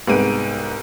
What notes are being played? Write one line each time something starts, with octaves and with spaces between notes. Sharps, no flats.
C2 G#2 B3 D7 D#7